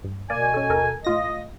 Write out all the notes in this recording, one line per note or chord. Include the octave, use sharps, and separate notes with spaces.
G2
B2 A#3 D5 G#5
C#4 A4
D#2 A4 A#4
A2 F4 D#5 A#6